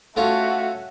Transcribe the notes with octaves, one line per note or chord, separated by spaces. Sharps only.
A3 C#4 F4 F#4 A4